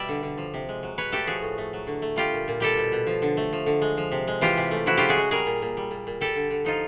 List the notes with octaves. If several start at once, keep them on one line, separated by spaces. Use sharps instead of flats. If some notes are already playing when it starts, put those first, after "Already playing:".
Already playing: B2 G3 D5 E5
D3
D3
F3
C3
G#3
F#3
B2 B4 C#5
A3 G4 A4
F3 F#4 G#4
A2
A3
F#3
D3
A3
G3 F4 G4
A#2
A#2
G3 G4 A4
B2
B2
F3
D3
A3
F3
D3
G#3
F3
C3
G#3
E3 F4 G4
C3
A3
F3 E4 F#4
C#3 F4 G4
F#4 G#4
G#3
G3 G#4 A#4
A#2
A#2
G3
A#2
A#2
G3 G4 A4
D3
D3
F3 D#4 F4